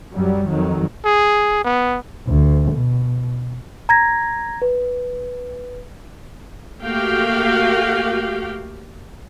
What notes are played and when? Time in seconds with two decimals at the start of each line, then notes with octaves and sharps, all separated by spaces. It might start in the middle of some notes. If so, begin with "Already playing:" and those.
0.12 F#2 F#3 G3
0.49 F2 D#3 F#3
1.05 G#4
1.64 B3
2.27 D2
2.72 B2
3.89 A#5 G#6 A#6
4.62 B4
6.82 A3 A#3 F#4 G4 F5 G5